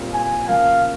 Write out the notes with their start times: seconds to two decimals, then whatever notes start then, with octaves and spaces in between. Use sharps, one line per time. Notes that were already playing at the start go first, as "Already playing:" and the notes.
Already playing: A#2 G3 C4 F4
0.14 G#5
0.48 C#3 F3 A#3 F5